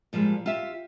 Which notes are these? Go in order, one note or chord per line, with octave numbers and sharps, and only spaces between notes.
A#2 F3 G3 G#3
F4 G4 E5